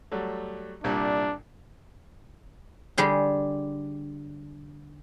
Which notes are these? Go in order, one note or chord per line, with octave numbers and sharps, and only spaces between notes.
F#3 G3 A3
C2 A#2 G3 D4
D3 G3 G4 G#4